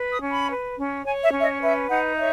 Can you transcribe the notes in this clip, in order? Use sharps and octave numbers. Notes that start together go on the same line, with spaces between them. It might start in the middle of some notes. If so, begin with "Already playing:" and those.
Already playing: B4
D#6
C#4
B5
B4
C#4
C#5 G#5
E5
C#4
E5
D#5
B4 E5
D#4 F#5
C#5 E5